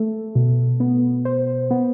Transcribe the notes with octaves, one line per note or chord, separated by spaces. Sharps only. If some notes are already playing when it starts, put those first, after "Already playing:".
Already playing: A3 A4
B2
B3
C5
B3